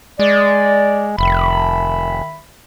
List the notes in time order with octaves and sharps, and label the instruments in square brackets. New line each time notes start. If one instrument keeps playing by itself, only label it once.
[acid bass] G#3 [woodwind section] D5
[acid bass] F1 [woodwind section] D#3 E5 B5